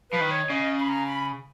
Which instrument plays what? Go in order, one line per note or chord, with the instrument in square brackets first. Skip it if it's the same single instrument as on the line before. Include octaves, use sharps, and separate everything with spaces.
[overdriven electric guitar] F3 [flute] B4
[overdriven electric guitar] D#3
[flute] C#5
[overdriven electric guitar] C#3 [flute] D#5
[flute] B5
A#5
B5